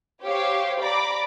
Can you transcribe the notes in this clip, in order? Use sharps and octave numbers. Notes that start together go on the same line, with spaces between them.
G4 C5 C#5 F5
D5 A#5 B5 D6